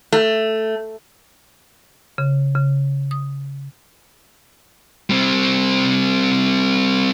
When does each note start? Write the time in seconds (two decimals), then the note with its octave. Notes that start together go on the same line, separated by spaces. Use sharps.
0.12 A3
2.18 C#3
2.55 C#3
3.11 D#6
5.10 G3 C4